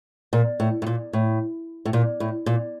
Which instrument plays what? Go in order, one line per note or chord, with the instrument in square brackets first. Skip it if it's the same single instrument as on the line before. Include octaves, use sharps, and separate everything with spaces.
[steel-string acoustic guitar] A#2
A2
A2
A#2
A2
A2
A#2
A2
A#2